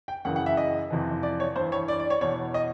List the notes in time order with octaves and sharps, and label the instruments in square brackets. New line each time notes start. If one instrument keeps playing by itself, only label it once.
[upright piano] G5
F#2 C#3 E3 F#5
F#5
E5
D#5
F2 C3 E3
D5
C#5
G2 E3 C5
C#5
D5
D5
C#5
E2 B2 C#5
D#5